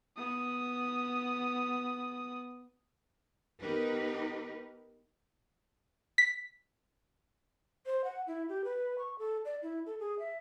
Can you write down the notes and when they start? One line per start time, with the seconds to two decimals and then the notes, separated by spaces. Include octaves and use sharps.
0.17 B3 D#6
3.60 B3 D#4 G4 A#4 B4
6.18 B6
7.86 C5
8.04 F#5
8.27 E4
8.49 G4
8.64 B4
8.98 C#6
9.19 A4
9.45 D5
9.62 E4
9.86 A4
10.00 G#4
10.19 E5